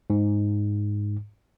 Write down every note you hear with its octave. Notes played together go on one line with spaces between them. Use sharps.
G#2